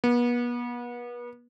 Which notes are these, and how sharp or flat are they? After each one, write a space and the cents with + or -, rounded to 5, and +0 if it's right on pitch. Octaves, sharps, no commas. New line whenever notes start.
B3 -35